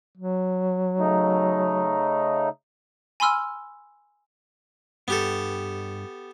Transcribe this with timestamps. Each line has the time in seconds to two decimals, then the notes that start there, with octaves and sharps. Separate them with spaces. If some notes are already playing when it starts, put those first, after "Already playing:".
0.17 F#3
0.99 C#3 A3 D#4
3.20 G#5 B5 C6 E6 F6
5.08 G2 B3 G4 A4